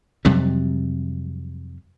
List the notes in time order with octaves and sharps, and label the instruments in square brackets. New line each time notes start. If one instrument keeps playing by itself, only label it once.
[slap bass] F2 C3 F#3 G3